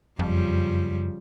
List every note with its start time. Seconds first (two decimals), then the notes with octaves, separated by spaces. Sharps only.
0.19 F#1 F2 C#3 F3 G3